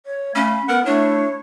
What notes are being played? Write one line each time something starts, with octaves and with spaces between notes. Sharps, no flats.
C#5
A3 C#4 F5 B5
B3 A#4 F#5
A3 D4 E4 C#5